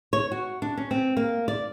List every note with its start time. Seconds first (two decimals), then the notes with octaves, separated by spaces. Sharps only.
0.13 C#5
0.32 F#4
0.62 D4
0.77 C#4
0.91 C4
1.17 A#3
1.48 D5